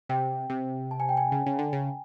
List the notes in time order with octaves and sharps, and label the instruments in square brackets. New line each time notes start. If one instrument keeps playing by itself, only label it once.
[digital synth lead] C3 [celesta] G5
[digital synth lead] C3
[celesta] A5
G#5
G5
G#5
[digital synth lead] C#3
C#3
D3
C#3